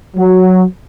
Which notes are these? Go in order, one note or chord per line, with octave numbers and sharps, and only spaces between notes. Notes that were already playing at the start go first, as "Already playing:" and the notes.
F#3